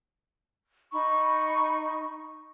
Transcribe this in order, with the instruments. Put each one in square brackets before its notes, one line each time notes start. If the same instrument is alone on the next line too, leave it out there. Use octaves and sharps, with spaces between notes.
[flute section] D#4 B5 C#6